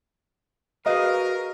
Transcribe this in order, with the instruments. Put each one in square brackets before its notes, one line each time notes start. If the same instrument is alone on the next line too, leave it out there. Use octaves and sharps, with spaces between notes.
[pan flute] F#4 [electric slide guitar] G#4 B4 F5 [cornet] A#4 [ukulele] D#5